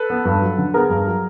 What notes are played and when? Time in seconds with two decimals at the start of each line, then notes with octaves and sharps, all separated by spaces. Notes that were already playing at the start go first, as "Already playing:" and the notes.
Already playing: A4 B4
0.10 B3
0.25 G2
0.42 F#3
0.58 D3
0.74 B3 G#4 A#4
0.90 G2
1.07 F#3